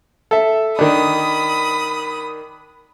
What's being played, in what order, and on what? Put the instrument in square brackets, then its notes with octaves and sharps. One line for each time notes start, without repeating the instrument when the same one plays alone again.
[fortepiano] A4 E5
[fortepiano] D#3 D4 [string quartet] B5 D#6